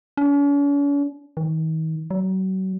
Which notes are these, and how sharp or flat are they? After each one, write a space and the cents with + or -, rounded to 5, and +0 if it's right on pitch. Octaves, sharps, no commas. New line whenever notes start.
C#4 +45
D#3 +40
F#3 +35